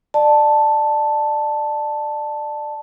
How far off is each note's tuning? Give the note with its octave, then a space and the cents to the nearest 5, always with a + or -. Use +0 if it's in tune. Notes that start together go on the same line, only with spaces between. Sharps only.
D5 +25 A5 +0